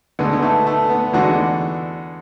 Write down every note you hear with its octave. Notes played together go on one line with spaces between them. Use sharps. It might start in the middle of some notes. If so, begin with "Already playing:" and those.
D2 D3 G#3 B3
B3
A3
A3
B3
E2 D3 G#3 F#4